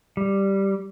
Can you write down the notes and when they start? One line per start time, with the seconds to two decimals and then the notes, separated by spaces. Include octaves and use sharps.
0.17 G3